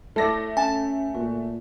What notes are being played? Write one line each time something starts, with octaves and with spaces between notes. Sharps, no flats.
A2 A3 A4 D5 A#6
C#4 G#5 A5
A#2 F#4